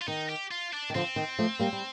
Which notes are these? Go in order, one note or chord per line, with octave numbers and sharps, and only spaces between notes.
F4
D#3 D#4
G4
F4
D4
D#3
D3 F3 C4
D#3
F3 A3
G3 A#3
G3